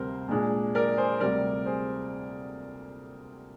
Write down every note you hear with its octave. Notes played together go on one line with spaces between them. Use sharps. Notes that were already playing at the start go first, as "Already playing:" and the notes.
Already playing: D2 C3 G3 C4 A#4 C5
A#2 G#3 D4
A#4 D5
G#4 C5
D2 C3 G3 A#4 D5
G#4 C5